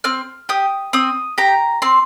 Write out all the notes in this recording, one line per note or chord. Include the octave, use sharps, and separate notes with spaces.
C4 F6
G4 D#6
C4 D#6
G4 A#5
C4 C6